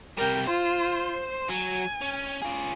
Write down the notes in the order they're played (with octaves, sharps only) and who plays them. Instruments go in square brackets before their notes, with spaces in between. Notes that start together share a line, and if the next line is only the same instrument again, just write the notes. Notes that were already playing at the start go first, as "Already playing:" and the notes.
[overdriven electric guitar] C3 G3 [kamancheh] A#4 G5
[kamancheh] F4 [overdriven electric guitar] C5
[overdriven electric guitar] F#3 [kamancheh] G#5
[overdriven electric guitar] C#4
F4 G#4